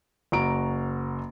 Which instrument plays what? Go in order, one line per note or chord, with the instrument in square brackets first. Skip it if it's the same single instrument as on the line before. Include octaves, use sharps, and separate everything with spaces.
[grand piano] F#1 F#4 A#5 D7